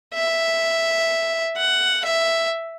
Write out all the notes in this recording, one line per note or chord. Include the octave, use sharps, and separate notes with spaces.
E5
F#5
E5